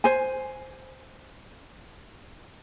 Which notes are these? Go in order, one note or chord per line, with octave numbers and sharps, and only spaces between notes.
C5 G#5